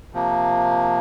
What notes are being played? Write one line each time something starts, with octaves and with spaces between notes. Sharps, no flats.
C3 F3 A#3